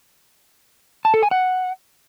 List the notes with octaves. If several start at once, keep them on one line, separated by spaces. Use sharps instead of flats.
A5
A4
G#5
F#5